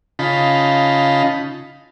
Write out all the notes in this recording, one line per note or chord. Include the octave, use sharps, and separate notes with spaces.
C#3 D#4 F4 A5 B5